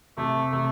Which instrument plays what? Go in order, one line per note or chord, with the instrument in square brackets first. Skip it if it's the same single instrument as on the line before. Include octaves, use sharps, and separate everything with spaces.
[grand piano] C3 [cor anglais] A3
[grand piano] C3 [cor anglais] A3